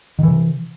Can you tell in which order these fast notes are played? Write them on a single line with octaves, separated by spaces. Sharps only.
D#3 E3 C3